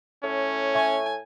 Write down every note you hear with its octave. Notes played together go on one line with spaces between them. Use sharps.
A2 C#4
E5 G#5 C#6